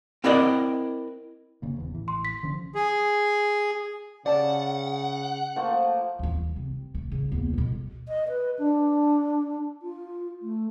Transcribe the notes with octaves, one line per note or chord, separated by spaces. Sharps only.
C4 E4 A#4 D5 D#5 F#5
F1 C#3 A#3
D#1 E2
A1 E3
C6
B6
D3 F3 C#4
G#4
C#3 D5 F#5 A5
F3 A3 A#3
D#2 E3
C3
A3
C#3
E2 A#3
D2 B2
D#5
B4
D4
F4
A3